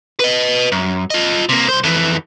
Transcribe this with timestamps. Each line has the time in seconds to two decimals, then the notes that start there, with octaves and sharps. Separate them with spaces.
0.20 B4 D#5
0.72 F#2
1.10 F4 D#5
1.49 C3 A#3
1.69 C2 C5
1.83 F2 E3